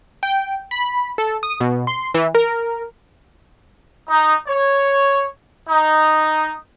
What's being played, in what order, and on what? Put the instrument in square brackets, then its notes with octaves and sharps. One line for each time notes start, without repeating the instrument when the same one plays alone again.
[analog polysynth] G5
B5
A4
D#6
B2
C6
E3
A#4
[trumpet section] D#4
C#5
D#4